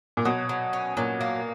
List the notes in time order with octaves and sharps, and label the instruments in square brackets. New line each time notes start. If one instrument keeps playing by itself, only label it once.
[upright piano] A#2
[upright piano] B2 [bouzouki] F#3
[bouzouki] F#3
C#4
[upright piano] A#2 [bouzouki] F#3
[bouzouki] A#3